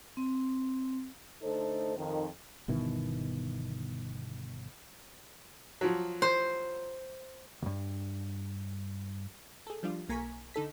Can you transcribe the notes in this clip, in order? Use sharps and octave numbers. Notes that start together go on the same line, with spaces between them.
C4
D3 A3 D#4 A4 C5
F2 D#3
G1 B2 D#3 E3
F3 F#3
C5
D2 G2
G#4 A4
F3 G3 D4 F4
B1 A#3 G#5 A#5 C#6 B6
D3 D#4 A4 B6